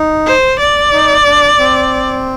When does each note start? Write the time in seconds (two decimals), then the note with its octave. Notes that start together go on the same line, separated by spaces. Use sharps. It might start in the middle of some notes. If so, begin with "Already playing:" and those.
Already playing: D#4
0.26 C5
0.60 D5
0.93 D#4
1.26 D4
1.59 C4